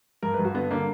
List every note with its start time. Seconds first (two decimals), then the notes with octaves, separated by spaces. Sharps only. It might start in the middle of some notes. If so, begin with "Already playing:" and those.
0.23 G2 A#4
0.34 B4
0.39 G2
0.45 F#4
0.54 D3 B3
0.71 D3 A#3